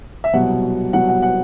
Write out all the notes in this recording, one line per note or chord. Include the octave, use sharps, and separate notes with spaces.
E5
C2 B2 F#3 F#5
C2 B2 F#3 F#5
F#5
F#5